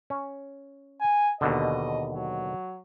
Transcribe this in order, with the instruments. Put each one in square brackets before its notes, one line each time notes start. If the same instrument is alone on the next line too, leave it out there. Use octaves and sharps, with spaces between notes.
[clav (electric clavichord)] C#4
[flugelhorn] G#5
[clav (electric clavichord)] D#2 B2 D3 [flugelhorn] D#5
[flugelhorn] F#3